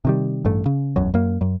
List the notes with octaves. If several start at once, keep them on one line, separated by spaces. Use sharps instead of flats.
C3 D#3 G3
A1 G2 A3
C#3
E1 B1 F#2 F#3
F#2 A#3
F#2